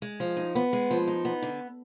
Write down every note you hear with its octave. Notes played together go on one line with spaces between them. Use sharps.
G#3
F3
D#4
B3
G#3
F3
D#4
B3
D3